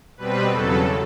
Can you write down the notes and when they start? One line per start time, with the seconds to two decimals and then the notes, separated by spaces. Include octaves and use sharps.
0.17 B2 G3 C4 B4
0.51 E2 C#3 F#3 A4